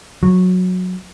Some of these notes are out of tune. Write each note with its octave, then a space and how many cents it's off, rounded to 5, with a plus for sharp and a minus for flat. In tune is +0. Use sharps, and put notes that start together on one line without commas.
F#3 -15